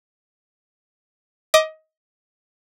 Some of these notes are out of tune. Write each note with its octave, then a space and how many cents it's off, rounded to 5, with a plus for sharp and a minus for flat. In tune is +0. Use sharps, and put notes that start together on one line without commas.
D#5 +20 D6 +15